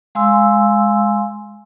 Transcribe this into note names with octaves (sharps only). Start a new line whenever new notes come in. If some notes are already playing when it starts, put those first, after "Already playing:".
G#3 F5 G#5 C6 E6